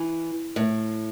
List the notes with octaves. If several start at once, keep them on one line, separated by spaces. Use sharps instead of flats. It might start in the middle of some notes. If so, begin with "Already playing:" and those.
Already playing: E3
A2